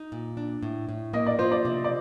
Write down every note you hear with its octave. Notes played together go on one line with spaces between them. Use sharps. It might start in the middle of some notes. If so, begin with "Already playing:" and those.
Already playing: D#4
A#2
D4
A2
A2
A#3 D#5
D5
F4 C5
D5
C3
D5